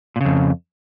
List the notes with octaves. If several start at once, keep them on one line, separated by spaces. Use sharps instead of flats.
F2 A#2 C#3